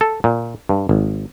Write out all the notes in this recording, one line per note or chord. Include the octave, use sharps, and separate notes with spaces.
A4
A#2
G2
G#1